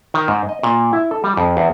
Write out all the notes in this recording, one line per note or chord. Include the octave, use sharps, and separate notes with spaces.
D#3
G#2
D#5
A#2
E4
A4
G3
F2
E2